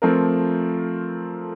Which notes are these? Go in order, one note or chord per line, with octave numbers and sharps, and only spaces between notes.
F3 A3 C4 F4 A#4